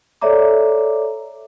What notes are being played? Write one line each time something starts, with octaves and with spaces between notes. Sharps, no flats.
A4 C#5 D5 E5 A#5 D6